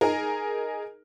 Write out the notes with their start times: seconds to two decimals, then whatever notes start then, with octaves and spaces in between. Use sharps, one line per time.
0.01 D#4 G#4 A#4